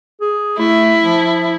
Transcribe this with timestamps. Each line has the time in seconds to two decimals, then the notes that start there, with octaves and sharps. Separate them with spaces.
0.21 G#4
0.58 A3 E4
1.03 F3